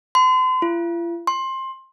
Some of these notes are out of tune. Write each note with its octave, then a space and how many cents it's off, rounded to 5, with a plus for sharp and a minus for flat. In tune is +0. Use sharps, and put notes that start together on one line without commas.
C6 -40
F4 -45
C6 +20